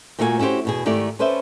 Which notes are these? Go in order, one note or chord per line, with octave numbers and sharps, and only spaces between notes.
A#2 A3 A#3 F#4 G4 G#5
C#4 E4 F#4 G4 C5
E2 B2 G#4
G#2 D#3 A3 E4 G4 D5
C#4 A4 B4 C5 D5 E5